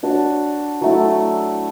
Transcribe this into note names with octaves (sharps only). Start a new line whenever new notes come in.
D4 F#4 C#5
F#3 A3 E4